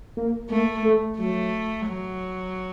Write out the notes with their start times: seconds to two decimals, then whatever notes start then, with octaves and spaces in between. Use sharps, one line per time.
0.17 A#3
0.50 A3 A#3
0.84 A3
1.19 F#3 A3
1.87 F#3